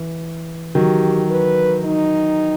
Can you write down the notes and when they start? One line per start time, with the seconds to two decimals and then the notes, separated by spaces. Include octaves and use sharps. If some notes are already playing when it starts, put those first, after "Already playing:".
Already playing: E3
0.75 D#3 F#3 G4
1.30 B4
1.85 D#4